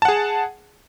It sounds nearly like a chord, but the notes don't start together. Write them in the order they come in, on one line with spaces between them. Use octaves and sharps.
A5 F#5 G#4